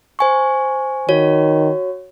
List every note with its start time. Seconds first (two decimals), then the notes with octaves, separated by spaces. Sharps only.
0.19 C5 G#5 C#6
1.09 D#3 F#4 C#5